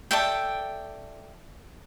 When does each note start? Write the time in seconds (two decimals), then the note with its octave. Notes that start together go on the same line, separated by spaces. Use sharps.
0.11 A4 D5 E5 G5